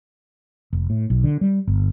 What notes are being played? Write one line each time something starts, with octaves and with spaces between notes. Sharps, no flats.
F1
A2
B1
D3
G3
G1